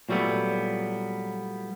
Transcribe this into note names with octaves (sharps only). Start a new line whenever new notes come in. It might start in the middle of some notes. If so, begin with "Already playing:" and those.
A#2 F#3 G3 A3 B3